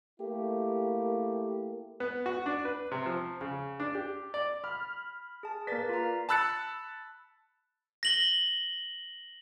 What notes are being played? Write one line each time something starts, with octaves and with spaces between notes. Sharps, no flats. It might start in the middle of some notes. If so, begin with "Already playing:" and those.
A3 A#3 E4 G4
B3
F#4
D4
B4
C3
F3
C#3
D4
G4
D5
B5 F6
G#4 A5
A#3 B4 D5 A6 B6
F4 F5 A#5
A5 B5 E6 F#6 A6 C#7
A#6 F#7 G7